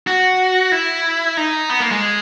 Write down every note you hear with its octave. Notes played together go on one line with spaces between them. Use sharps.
F#4
E4
D#4
B3
A#3
G#3